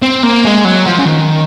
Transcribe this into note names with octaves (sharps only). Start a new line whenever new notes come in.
C4
A#3
G#3
F#3
F3
C#3
D#3